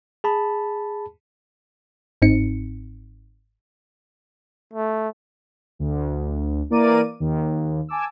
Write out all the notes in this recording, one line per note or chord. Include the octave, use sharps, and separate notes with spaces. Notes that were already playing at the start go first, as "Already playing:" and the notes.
G#4 A5 B5
G1 G#2 C4 D#4 C#7
A3
D2
E3 A#3 A#4 D5 D6 D#7
D#2
G#5 A5 D6 E6